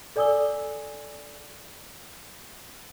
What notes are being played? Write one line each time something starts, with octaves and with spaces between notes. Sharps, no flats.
A4 D5 G#5 D#6 E6 G7